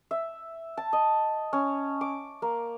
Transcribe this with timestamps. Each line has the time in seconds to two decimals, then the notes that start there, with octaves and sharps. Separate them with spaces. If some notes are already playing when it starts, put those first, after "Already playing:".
0.11 E5
0.77 A5
0.93 D#5
1.53 C#4
2.01 D6
2.42 A#3